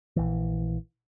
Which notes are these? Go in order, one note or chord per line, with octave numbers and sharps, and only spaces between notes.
A#1 E3